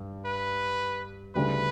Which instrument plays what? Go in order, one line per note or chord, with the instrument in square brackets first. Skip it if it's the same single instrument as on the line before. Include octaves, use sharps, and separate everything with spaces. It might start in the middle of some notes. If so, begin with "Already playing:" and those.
Already playing: [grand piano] G2
[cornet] B4
[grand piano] D2 C#3 G3 [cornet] B4